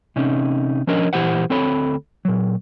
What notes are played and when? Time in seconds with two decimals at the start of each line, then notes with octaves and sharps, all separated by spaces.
0.16 C3 C#4 D#4
0.87 F3 C#4 D4 A#4 C#5 D#5
1.13 A#2 E3 E4 G4 C5 F#5
1.50 D2 C4 A4 C#5 B5
2.25 A#2 F#3